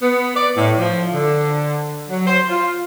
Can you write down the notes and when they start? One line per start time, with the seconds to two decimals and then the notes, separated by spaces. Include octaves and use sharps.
0.02 B3
0.35 D5
0.57 A2
0.79 F3
1.13 D3
2.09 F#3
2.27 C5
2.49 F4